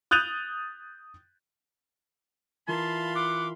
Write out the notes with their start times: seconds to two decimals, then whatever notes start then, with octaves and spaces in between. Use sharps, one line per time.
0.11 D#6 F#6 G6 A6 D#7 F7
2.68 E3 F4 A#4 F5 A5 B5 C6
3.15 F#5 D6